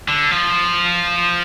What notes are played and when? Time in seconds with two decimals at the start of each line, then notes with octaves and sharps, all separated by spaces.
0.08 D3
0.31 F3